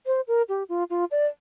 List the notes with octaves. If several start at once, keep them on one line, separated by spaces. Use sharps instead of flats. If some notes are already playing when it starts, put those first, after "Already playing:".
C5
A#4
G4
F4
F4
D5